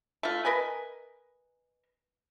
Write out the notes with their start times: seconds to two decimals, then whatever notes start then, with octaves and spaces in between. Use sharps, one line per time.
0.23 A3 F4
0.45 A#4 B4 D#5 G#5